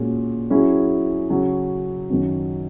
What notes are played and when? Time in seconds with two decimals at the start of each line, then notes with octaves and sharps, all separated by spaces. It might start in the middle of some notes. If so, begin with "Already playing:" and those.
Already playing: A#2 G#3 C#4 F#4
0.50 F#3 C#4 E4 G#4
1.30 C#3 F#3 C#4
2.10 F#2 D#3 F#3 C#4